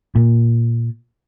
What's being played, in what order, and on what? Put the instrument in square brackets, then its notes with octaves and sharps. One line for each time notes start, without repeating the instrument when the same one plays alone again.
[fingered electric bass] A#2